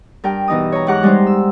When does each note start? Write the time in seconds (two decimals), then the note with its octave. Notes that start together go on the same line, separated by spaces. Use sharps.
0.24 G2 A#4 G5
0.48 B2 E3 D#4 D#5 D#6
0.72 C#5 A#5
0.87 G#2 G4 F#5 A#5 F#6
1.03 G3 G#3 D#4 C5
1.27 E6